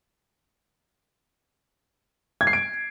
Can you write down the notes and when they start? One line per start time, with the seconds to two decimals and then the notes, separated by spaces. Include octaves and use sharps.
2.41 G#6
2.47 C7
2.53 D7